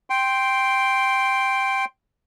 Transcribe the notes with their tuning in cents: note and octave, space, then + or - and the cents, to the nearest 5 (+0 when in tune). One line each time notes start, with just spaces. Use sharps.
G5 +0 C6 +0